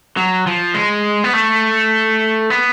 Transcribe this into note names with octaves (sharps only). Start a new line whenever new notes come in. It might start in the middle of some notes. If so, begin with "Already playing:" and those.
F#3
F3
G#3
B3
A3
B3